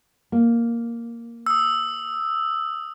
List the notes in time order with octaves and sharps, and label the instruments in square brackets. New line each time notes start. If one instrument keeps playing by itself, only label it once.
[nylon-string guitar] A#3
[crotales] D#6 E6